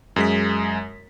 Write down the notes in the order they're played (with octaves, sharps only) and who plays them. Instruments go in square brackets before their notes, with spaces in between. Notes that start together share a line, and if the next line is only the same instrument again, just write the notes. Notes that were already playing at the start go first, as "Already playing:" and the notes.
[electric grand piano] F#2 G#3 B6